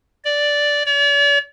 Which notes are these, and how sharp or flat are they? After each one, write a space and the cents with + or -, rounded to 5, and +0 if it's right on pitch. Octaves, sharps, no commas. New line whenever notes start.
D5 -5
D5 -45